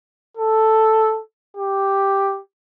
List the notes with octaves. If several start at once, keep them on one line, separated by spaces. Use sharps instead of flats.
A4
G4